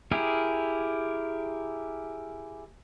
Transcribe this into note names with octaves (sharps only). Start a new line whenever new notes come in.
E4 G4 G#4 A#4